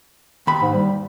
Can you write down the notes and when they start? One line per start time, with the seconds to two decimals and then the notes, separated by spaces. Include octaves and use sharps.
0.47 D#2 B5
0.62 G#2
0.74 G3